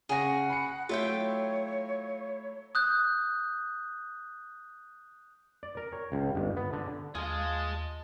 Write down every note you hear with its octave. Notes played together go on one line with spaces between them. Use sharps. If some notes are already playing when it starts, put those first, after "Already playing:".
C#3 F#4 G#4 F#5 A#6
B5 C#7
F#3 A3 E4 F4 C#5 E5 G5
D#6 F#6 G6
D5
A#4
C#5
C#2
G1
B3
D3
D#2 F4 G#4 D#5 A5